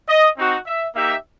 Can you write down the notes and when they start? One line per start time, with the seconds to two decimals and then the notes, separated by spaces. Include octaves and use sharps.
0.09 D#5
0.38 C4 D#4 F#4
0.66 E5
0.95 A#3 D#4 G4 E5